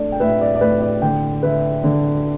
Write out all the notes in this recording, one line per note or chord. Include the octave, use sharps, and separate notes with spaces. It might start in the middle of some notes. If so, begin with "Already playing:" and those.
Already playing: A3 D4 D5
G5
A2 B4 E5
D5
D5
A2 B4
D5
D3 D5 G5
D3 B4 E5
D3